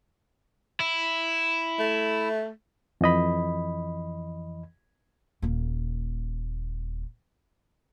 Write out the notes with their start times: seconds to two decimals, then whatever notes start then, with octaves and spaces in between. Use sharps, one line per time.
0.80 E4
1.79 A3
3.01 F2 E3 D#5 B5
5.42 D#1 A#3